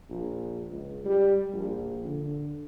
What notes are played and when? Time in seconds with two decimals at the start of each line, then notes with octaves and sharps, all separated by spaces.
0.10 A#1
0.70 C#2
1.05 G3
1.53 A#1
2.05 D3